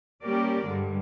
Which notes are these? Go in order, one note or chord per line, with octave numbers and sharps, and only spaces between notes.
G3 A#3 C#4 G4 A#4 D5
G2 D3 G3 G#3